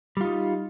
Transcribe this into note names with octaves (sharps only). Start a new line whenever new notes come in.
G3 D#4 F4